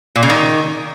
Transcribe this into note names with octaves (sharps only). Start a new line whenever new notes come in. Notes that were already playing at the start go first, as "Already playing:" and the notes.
A#2
C#3
D#3